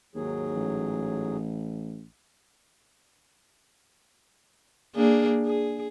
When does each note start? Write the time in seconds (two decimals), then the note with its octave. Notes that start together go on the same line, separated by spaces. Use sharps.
0.15 D#2 G#2 F#3 G#4
0.55 A1
4.95 A#3 D4 G#4
5.45 G#4